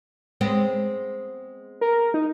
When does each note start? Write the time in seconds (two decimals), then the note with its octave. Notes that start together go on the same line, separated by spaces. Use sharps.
0.41 G#3 B3 C4
1.81 A#4
2.14 D#4